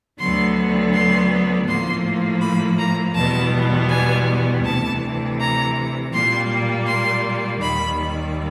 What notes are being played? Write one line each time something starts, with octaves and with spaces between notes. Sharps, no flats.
D2 D3 F#3 B3 C6
C6
A2 F3 A#3 C6
B5
A#5
E2 B2 G3 B3 A5
G#5
D2 C3 E3 A5
A#5
A#2 G3 A#3 C6
C6
D#2 D#3 G3 B5